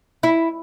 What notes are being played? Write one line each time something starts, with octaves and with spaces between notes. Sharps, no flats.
E4